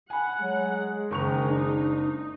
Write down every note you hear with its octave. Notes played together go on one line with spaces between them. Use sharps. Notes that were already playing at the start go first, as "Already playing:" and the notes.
F#5 G#5 B5
F#3 G#3
F#1 D#3 D#4 C#6 F7
D4